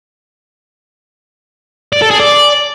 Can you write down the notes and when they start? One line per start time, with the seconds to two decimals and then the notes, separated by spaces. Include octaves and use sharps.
1.93 D5
2.02 A4
2.11 G#4
2.20 D5